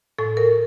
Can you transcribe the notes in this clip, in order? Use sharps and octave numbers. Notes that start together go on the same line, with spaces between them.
A2 A4
A#4